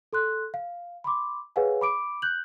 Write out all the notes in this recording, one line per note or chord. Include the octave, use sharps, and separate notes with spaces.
A4 C6 F#6
F5
B5 C6 D6
G#4 B4 C#5 F5 F#5 G#5
B5 D6 D7
F#6 G6 F#7